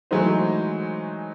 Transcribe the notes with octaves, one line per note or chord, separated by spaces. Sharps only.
E3 F#3 G#3 A3 D#4 C5